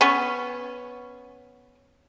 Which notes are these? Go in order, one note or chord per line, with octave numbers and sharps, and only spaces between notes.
B3 C#4